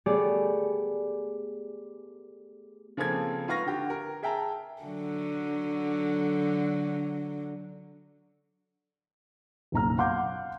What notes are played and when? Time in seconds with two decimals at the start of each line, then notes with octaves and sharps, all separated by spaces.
0.06 A3 B3 G4 G#4 D5
2.97 C#3 F3 A#3 C4 A4 G#6
3.48 G#2 F4 B4 F5 C#6 A#6
3.66 D3 G4
3.90 A#4
4.23 G#4 E5 G5 A5 A#5
4.82 D3 F#3
9.72 F#1 B1 A#5 F6
9.98 F5 F#5 C6 D6 G6